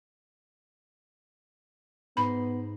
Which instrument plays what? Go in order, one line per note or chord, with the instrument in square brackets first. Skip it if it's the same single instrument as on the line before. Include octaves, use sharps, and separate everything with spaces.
[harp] G#2 D#4 C7 [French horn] B3 [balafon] B5